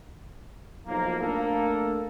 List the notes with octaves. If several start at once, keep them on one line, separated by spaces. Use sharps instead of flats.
B1 F3 A#3
A3 A#3 D4 A4